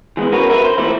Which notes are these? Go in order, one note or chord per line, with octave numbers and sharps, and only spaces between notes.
E3 G#3 B3 E4
C#4 F#4 A#4 B4 C#5
G2 A#4 B4 E5
C5
A#2 E3 A3 E4